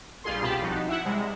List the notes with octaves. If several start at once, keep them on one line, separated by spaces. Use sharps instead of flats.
A#1 G3 F4 G#4 C6
C2 B2 F4 G4 A5 B5
F3 D#4 F#4
E4 E5 F#5
C3 G3 G#3